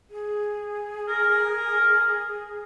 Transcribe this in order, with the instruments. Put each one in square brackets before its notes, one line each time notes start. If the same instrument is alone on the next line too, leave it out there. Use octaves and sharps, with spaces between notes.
[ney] G#4
[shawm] A#4